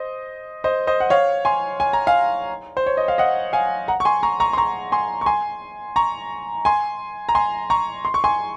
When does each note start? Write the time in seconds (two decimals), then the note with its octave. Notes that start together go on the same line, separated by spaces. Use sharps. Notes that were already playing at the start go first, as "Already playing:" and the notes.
Already playing: C5 D#5
0.64 C5 D#5
0.87 C5 D#5
1.00 F#5
1.10 C#5 F5
1.45 G#5 C6
1.80 G#5
1.93 A#5
2.07 F5 G#5
2.77 C5
2.86 C#5
2.97 D#5
3.08 F5
3.18 D#5 F#5
3.53 F5 G#5
3.88 F#5 A#5
4.00 C#6
4.05 G#5 C6
4.23 A#5 C#6
4.40 A#5 C#6
4.53 C6
4.58 A#5 C#6
4.92 G#5 C6
5.21 C#6
5.26 G#5 C6
5.96 A#5 C#6
6.65 G#5 C6
7.29 A#5
7.35 G#5 C6
7.70 A#5 C#6
8.05 C6
8.14 C#6
8.24 G#5 C6